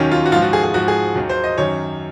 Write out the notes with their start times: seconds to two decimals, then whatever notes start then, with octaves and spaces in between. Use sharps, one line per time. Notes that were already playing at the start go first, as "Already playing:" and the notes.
Already playing: D#2 D#3 F#3 C#4
0.11 F4
0.26 F#4
0.32 G#2 F4
0.36 F3
0.42 F#4
0.53 G#4
0.63 G#4
0.74 G#2 F3 F#4
0.88 G#4
1.15 D#2 D#3 F#3
1.29 C5
1.44 D#5
1.57 F#2 D#3 F#3 C#5